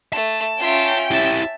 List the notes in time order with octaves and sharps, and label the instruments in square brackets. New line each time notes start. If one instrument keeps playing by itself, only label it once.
[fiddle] A3 [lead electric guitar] A5
[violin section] C#4 G5 [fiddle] F4 E5
[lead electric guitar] E4 G4 [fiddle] E5 A5